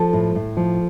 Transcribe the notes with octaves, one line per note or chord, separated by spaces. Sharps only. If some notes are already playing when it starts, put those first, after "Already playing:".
Already playing: F3 A4
A2
A2
F3